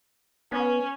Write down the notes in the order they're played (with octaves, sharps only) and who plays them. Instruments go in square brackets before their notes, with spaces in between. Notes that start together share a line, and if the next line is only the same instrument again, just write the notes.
[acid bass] B3 [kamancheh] C#4